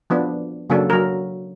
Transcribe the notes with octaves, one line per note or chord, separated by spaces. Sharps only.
F3 B3 D4
C#3 F#3 A#3 D4 A4
F#3 A#4